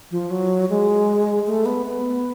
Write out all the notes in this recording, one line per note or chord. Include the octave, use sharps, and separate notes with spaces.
F3
F#3
G#3
A3
B3
B3